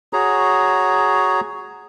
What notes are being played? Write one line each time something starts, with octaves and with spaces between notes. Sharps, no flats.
F#4 G#4 C#5 A#5